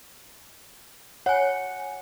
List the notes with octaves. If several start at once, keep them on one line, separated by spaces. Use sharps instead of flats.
C#5 F#5 G#5